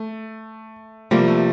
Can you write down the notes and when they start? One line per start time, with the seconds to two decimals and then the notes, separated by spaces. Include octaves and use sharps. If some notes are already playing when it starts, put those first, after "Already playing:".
Already playing: A3
1.11 C3 F3 G3 A#3
1.28 A3